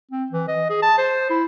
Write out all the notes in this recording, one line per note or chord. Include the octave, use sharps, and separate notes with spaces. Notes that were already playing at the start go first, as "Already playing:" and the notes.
C4
E3
D#5
G#4
A5
C5
E4